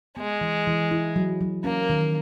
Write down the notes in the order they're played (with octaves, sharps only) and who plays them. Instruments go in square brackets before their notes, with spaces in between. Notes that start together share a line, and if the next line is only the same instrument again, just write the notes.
[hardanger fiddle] G#3 [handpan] B3
[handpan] E3
E3
E4
F#3
F#3
[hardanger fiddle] A#3 [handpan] C#4
[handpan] D#3